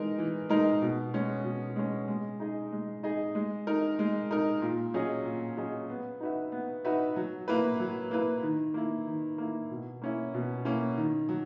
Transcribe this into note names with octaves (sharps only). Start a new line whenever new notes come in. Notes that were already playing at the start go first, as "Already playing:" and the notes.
Already playing: E3 G#3 D#4 A#4
E3
G#3 D#4 A#4
B2
G#3 C#4
B2
G#3 C#4
G#3
D#4 G#4 D#5
G#3
D#4 G#4 D#5
G#3
D#4 A#4
G#3
D#4 A#4
A#2
F#3 C#4 G#4 D#5
A#2
F#3 C#4 G#4 D#5
B3
D#4 F#4 B4 E5
B3
D#4 F#4 B4 E5
F#3
A#3 E4 B4
F#3
A#3 E4 B4
D#3
A#3 E4
D#3
A#3 E4
B2
A#3 C#4 E4
B2
A#3 C#4 E4
D#3
F#3